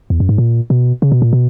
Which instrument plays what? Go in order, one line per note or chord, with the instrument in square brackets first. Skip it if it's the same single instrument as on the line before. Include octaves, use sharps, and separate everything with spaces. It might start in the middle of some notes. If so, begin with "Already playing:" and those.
[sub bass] E2
F#2
G#2
A#2
B2
C#3
B2
A#2
B2